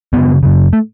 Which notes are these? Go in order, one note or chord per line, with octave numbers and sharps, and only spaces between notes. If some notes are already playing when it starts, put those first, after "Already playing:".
F#2 C#3 B3
F#2 C#3
A3